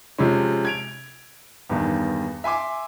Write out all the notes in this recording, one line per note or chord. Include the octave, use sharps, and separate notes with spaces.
C3 F3 G#3 C#4
G#6 D7 F7
E2 G2 D#3
E5 G#5 C6 D6